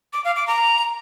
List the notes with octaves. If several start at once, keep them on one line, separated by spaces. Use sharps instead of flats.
D6
F5
D6
A#5